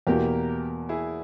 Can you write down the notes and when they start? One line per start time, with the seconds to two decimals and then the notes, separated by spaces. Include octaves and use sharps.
0.07 E2 B2 A#3 G4 A#4
0.89 E4 G#4